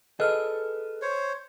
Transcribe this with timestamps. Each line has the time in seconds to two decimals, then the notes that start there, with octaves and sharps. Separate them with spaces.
0.20 G#4 A4 B4 D#5 F6
1.02 C5 C#5